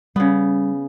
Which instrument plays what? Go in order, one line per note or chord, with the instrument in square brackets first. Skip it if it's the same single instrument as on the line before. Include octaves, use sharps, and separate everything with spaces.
[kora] C#3 B3 [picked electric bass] G3